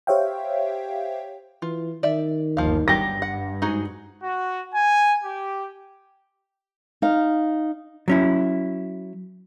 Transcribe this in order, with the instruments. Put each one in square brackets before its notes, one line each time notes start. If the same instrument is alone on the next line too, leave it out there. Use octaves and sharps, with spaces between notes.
[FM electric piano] G4 C5 C#5 E5 F5 G5
[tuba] E3 [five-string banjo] F4
[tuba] D#3 [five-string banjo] D5 E5
[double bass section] G1 D#2 [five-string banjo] F3 F5
[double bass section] G2 [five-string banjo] F#3 G4 [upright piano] A#6
[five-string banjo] F#5
[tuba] G#2 [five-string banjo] D#4 F#4 G#4
[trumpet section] F#4
G#5
G4
[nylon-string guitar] D#4 F5
[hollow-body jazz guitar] F#3 C#4 E4